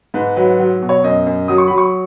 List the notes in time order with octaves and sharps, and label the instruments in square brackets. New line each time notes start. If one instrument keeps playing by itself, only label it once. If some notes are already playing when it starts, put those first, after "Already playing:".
[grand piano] G#2 B4
F#3 B4
F#3
B2
C#5
F#2 D#5
F#2
F#3 D#6
C#6
F#3 B5
C#6